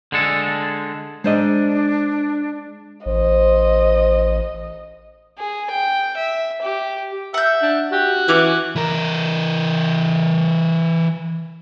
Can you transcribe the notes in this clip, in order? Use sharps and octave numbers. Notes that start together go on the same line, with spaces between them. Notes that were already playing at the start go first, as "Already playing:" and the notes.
D3 G#3 A4
G#3 D4 C5 D#5
A1 C5 D#5
G#4
G5
E5
G4
E5 F#5 G6
D4
F#4 G4
E3 C#4 D6
E3 A#4